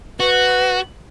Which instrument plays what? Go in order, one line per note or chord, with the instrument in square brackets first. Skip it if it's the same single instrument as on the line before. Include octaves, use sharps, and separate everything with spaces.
[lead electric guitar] F#4 [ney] B4